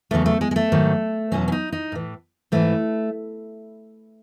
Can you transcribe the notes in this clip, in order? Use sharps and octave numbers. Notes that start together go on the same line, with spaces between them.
E2 C#3 F#3 A3
A3
G#3
G#3
A3
G#2 D#3 F#3
E2 B2 F#3 C#4
C#4
D#4
D#4
A2 E3
G#2 E3 A3